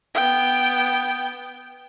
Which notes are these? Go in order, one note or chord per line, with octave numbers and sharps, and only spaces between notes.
B3 G5